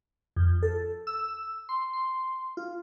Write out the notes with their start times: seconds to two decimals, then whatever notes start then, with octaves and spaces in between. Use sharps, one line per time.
0.36 F2
0.63 A4
1.07 E6
1.69 C6
1.93 C6
2.57 F4